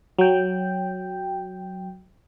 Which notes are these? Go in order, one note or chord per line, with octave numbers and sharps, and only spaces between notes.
F#3 G5